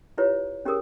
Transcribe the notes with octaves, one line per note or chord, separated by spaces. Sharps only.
E4 F4 G4 B4 C#5
C#4 G4 G#4 A#4 D#6